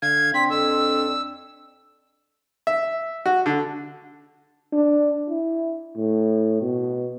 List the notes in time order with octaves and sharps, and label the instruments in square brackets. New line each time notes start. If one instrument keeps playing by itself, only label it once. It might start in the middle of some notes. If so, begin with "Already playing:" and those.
[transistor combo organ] D3 F5 [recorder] G#6
[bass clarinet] C4 [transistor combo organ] D4 [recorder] B6
[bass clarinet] F2 [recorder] E6
[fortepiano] E5
F#4
D3
[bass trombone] D4
E4
A2
B2